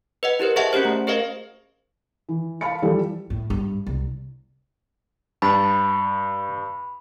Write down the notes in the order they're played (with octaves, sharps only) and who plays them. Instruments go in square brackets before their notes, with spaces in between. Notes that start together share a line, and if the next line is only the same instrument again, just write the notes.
[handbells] B4 D#5 F#5
E4 G4 A#4 C5
G#4 C5 D#5 E5 F#5 A5
C#4 F#4 G4 C5
A3
G#4 A#4 C5 D#5 F5
[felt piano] E3
F5 A5 B5 C#7
E3 F3 G3 A4
[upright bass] A2
G2
C2
[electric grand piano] G2 [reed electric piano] A5 [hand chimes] B5